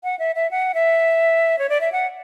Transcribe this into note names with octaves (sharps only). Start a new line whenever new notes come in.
F#5
E5
E5
F#5
E5
C#5
D5
E5
F#5